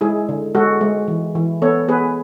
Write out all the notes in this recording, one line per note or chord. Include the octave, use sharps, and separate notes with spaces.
G#3 E4 G#4
D3
G#3 F#4 A4
G#3
E3
E3
B3 A4 C#5
B3 G#4 B4